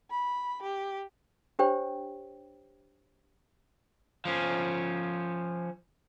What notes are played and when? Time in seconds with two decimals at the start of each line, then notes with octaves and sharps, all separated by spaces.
0.10 B5
0.62 G4
1.59 D4 G4 C5 C#5 G5
4.25 F3 C#4